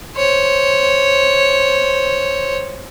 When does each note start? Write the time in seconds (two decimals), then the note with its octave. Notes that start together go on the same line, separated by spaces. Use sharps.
0.16 C5 C#5